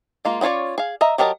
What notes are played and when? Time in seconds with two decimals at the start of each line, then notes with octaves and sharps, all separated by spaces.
0.25 G#3 A#3 F4
0.41 B3 C#4 F4 C#5 D5
0.78 G#4 F5
1.01 D#5 E5 A#5
1.18 F#3 G4 A#4 D#5 A5